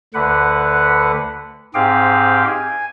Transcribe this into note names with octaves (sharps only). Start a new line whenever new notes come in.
D2 D3 B4 F#5
G#2 C4 G4 G#4 F5 G5
G#5